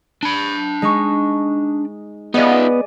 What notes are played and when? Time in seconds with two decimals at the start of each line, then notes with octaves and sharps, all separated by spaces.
0.23 D4 B5
0.82 G#3 D#4 C#6
2.34 B3 D#4 F4 G#4 D5 D#5